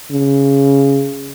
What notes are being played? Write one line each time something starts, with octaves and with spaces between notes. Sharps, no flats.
C#3